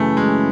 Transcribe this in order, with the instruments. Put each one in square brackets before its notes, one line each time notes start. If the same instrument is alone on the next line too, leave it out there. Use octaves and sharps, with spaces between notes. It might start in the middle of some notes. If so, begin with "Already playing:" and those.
Already playing: [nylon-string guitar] F#2 C#3 E3 [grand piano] A3
[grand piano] G#3